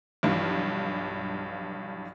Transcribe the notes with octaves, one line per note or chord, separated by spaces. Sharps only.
B1 G2 E3 F3